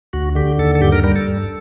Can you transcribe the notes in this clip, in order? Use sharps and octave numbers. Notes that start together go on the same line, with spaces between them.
D2 F#4
D3 G4
D#2 A4
A4
G2 G4
A#4
G3 A#4
A4
G2